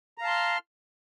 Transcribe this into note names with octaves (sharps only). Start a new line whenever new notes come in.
F5 A5 A#5 C6 F6